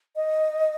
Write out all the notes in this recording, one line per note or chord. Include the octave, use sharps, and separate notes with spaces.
D#5